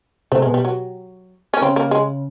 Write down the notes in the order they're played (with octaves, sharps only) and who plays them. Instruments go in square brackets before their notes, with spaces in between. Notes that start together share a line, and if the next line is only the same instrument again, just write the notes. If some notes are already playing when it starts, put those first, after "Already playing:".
[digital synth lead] C3 [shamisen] A3
[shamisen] G#3
[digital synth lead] B2
[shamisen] G3
F#3
C#4
[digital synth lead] C#3 [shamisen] C4
[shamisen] A#3
G#3